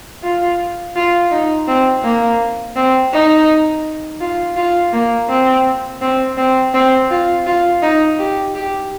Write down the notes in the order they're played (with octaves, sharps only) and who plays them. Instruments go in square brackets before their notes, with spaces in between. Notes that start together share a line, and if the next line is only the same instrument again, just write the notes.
[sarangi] F4
F4
D#4
C4
A#3
C4
D#4
F4
F4
A#3
C4
C4
C4
C4
F4
F4
D#4
G4
G4